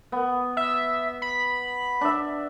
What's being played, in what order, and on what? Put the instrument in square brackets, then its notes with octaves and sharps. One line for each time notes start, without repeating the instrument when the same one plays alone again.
[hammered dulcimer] B3
[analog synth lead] E5
B5
[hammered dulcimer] D4 E5